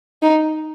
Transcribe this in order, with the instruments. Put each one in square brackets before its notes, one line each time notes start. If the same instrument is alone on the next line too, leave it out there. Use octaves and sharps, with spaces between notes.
[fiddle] D#4